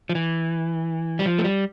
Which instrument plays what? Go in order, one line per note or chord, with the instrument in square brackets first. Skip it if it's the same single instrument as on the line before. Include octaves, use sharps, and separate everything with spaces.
[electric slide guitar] F3
E3
G3
F3
A3
G3